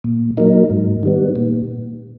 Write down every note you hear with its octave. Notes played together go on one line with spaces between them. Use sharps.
A#2
F#3 A#3 D#4
G#2
D#3 G3 B3
A#2